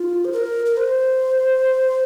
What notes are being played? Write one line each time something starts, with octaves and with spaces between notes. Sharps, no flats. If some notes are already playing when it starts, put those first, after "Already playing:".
Already playing: F4
C5
A#4
A#4
C5